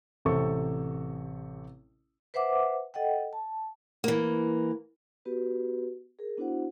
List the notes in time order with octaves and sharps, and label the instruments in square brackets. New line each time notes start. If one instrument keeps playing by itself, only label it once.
[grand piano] A1 C3 C4 A4 C#6
[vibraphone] B4 C5 E5 F#5 D6
A4 D#5 F#5 G5
A5
[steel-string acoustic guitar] E3 A#3
[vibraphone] B3 F#4 G4 B4
G#4 A#4
B3 D4 E4 F#4 C5 F#5